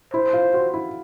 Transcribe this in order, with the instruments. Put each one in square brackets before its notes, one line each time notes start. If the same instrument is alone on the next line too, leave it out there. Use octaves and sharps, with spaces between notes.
[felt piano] E4 [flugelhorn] C5
[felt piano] F4
F#4
E4